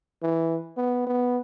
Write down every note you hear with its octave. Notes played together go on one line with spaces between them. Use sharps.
E3
B3
B3